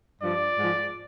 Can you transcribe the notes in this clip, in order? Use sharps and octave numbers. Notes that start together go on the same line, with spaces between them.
G2 F3 D5
G#2 F3